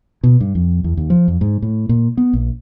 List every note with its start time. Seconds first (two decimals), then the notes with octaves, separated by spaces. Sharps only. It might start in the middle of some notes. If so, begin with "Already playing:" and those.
0.23 B2
0.40 G2
0.55 F2
0.84 E2
0.97 D#2
1.10 F3
1.28 F2
1.41 G#2
1.62 A2
1.89 A#2
2.17 B3
2.33 A#1